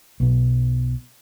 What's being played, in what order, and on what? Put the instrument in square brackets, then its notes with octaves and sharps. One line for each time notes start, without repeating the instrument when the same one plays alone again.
[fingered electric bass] B1 B2